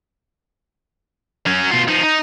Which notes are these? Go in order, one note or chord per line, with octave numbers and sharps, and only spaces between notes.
F#3 C#4
B2 F4
F3 D#4
D#4